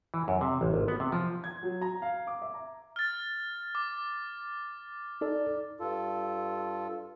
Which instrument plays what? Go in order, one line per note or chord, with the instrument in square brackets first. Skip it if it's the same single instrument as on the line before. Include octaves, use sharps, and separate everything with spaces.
[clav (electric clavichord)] E3
F#2
C3
A1
G#1
B3
C3
F3
[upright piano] G#6
F#3
A#5
F5
D6
E5
A#5
[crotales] F6 A6
D6
[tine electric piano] D#4 A4 D5
[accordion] G2 F4 A4